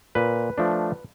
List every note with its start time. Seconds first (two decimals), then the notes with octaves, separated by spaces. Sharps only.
0.15 A#2 B4
0.58 F3 A3 D4